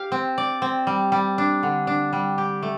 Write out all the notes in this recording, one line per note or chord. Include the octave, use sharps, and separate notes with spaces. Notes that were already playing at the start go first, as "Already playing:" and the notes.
Already playing: G4 F5
C4
D5
C4
G3
G3
D4
D3
D4
G3
G4
A3